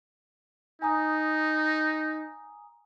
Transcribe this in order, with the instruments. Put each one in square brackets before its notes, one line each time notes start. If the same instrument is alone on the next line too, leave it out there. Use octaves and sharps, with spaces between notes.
[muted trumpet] D#4 [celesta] G#5 A#5 D#6